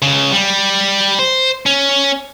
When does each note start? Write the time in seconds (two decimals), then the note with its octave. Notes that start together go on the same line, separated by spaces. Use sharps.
0.02 C#2 C#3
0.32 G3
1.19 C5
1.66 C#4